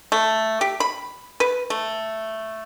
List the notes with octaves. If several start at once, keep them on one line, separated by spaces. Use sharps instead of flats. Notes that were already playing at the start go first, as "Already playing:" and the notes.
A3
G4
B5
B4
A3